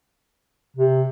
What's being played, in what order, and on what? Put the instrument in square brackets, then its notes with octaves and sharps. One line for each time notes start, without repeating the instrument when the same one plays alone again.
[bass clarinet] C3